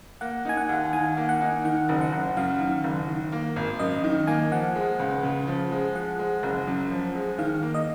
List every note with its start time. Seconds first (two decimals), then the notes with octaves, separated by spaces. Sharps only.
0.21 A#3 F#5
0.45 D#4 G#5
0.57 F#5
0.69 D#2
0.93 D#3 G#5
1.17 A#3
1.29 F#5
1.41 D#4
1.64 D#3 F#5
1.89 F#1
2.01 F#5
2.12 F#1
2.37 F#2 F5
2.60 D#3
2.84 F#1
3.08 D#3
3.32 A#3
3.56 G#1
3.79 F#2 D#5
4.04 D#3
4.27 A#3 G#5
4.52 F3 F#5
4.76 G#3
4.99 C#2
5.23 C#3
5.47 F3
5.71 G#3
5.95 F3 F#5
6.19 G#3
6.43 F#1
6.67 F#2
6.91 F3
7.15 G#3
7.38 D#3 F5
7.63 A#3
7.74 D#5